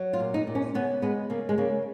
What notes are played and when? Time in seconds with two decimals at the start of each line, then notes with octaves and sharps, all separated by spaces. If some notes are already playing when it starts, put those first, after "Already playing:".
Already playing: F#3
0.13 F4
0.20 A#2
0.34 D#4
0.47 A#2
0.55 C#4
0.74 C#3 B3
1.02 G#3 B3
1.30 C#3 A#3
1.49 G#3
1.58 C#3 A#3